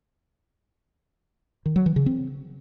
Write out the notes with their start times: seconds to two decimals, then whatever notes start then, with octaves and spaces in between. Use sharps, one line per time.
1.66 D#3
1.76 F#3
1.86 E3
1.96 C#3
2.06 C4